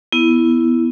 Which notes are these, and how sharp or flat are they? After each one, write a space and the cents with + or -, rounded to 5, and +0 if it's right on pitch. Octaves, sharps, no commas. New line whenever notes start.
B3 +0 E4 +0